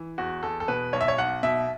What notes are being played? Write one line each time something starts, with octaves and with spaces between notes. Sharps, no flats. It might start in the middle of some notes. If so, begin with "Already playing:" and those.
Already playing: E3
E2 F#4
E2 A4
A4
B2 B4
B1 C#5
E5
C#5
B1 F#5
B2 E5